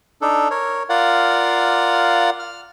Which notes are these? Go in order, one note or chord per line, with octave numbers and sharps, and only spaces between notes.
D4 D#4 A4
A#4 C#5
F4 A#4 D5 F5 F#5
F6